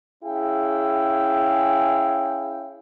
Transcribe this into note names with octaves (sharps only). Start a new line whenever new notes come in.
C#4 E4 G#4 F5 G5